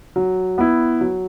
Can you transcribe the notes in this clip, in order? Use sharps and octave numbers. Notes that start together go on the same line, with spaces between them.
F#3
B3 E4
F#3